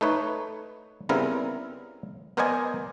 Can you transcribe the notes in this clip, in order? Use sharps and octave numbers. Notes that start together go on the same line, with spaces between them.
A3 D#4 B4 C#5
C#3 G3 B3 C4 E4 A#4
B3 A#4 C5 D5 D#5 G#5